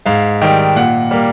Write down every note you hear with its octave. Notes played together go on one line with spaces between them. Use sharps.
G#2 F5
D#3 G3
A#2 F#5
G3 A#3